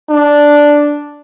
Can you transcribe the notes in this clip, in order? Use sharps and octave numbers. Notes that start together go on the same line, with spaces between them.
D4